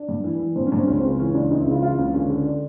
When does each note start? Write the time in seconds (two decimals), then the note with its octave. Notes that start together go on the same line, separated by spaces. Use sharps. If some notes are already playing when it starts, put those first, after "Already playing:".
Already playing: D4
0.09 G2
0.24 E3
0.39 E3
0.56 G2 C4
0.67 C#4
0.72 G2
0.78 C4
0.87 C#2 C#4
0.98 C4
1.04 C#3 C#4
1.19 E3 C#4
1.35 C#2 D4
1.51 C#2 D#4
1.61 E4
1.67 C#3
1.72 F4
1.83 E3 F4
1.99 C#2
2.14 D3 C#4
2.30 D3
2.46 D4